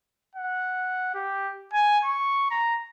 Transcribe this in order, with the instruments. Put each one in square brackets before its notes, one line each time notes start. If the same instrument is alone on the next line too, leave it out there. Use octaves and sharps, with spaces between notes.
[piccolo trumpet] F#5
G4
G#5
C#6
A#5